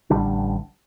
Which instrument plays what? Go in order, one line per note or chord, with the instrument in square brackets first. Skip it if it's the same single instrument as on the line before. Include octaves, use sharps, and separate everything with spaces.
[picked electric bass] A1 D3 G3 D4